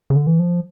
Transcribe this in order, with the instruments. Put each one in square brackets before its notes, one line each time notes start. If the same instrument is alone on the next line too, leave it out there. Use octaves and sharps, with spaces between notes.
[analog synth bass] C#3
D3
E3
F3